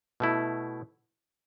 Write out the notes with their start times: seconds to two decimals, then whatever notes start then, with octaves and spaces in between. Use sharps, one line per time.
0.20 B2 A3 E4